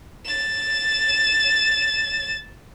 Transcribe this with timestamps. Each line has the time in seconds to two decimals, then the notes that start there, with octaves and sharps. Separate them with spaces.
0.25 A6 E7